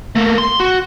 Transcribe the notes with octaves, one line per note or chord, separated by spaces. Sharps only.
A3 A#3
C6
F#4